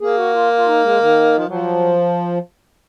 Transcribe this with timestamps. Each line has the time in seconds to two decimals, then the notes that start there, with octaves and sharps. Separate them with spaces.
0.01 A#3 G#4
0.18 F#4
0.34 F4
0.57 F4
0.67 D#4
0.83 G#3
1.00 D#3
1.39 F3
1.49 F3 F#3